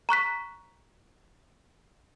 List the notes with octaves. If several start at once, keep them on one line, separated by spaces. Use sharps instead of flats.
A#5 C#6 F#6 B6